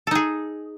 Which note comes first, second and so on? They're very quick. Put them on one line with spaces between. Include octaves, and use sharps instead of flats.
A4 D#4 G#4